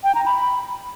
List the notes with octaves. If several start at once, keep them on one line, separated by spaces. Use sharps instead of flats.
G5
A#5
B5